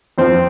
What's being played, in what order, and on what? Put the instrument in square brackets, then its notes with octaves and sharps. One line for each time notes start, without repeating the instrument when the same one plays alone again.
[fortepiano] F2 F3 C4